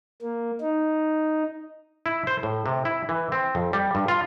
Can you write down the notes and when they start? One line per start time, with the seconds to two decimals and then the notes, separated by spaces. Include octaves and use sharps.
0.22 A#3
0.61 D#4
2.06 E4
2.27 C5
2.43 A2
2.66 C3
2.85 E4
3.09 E3
3.32 C4
3.55 F2
3.73 G3
3.95 G2
4.08 F4